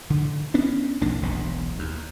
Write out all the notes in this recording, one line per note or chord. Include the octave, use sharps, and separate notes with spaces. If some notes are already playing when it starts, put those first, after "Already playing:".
D3
B3 C#4 D4
B1 F2 A#3 D4
E1 B1 A2
D#2